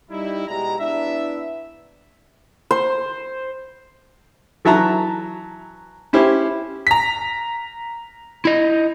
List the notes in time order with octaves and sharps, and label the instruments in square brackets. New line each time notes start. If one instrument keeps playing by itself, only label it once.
[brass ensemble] G3 D#4 E4
B2 G#3 G4 A#5
B3 D4 E4 E5
[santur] C5
[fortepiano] E3 F#3 E5 A5 A#5
C#4 E4 G4 C5
[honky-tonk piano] A#5 B6
[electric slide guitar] E4 D#5